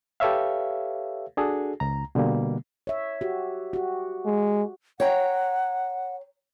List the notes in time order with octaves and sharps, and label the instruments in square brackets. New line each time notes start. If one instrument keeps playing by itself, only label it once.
[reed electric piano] G4 A4 B4 C#5 E5 F5
D4 F#4 G#4 A4
C#2 A#5
B2 D3 G3 A#3
[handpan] C#5 E5
F#4 G4
F#4 G4
[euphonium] G#3
[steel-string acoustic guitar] C#5 G5 A#5 [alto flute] F#5